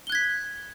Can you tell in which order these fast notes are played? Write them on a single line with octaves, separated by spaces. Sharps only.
G7 F#6 G#6 B6